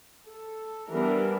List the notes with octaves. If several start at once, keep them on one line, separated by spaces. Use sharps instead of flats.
A4
E3 G3 B3 D4 A#4